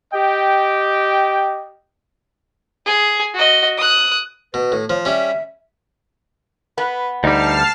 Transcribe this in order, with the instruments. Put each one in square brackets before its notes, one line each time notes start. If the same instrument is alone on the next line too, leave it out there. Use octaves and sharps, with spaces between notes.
[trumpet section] G4 D#5 G5
[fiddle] G#4 G#5
F#4 D#5
D#6 F#6
[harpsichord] B2 [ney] B4
[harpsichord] A2
[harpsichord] F3 [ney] C#5
[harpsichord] G3 C#4 [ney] E5
[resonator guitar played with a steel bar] B3 [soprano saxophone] B4
[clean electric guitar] D2 G3 [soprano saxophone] D#4 [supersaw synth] A5 F6 C7